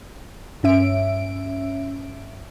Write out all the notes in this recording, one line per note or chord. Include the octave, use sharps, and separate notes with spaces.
G2 C#4 E5 D7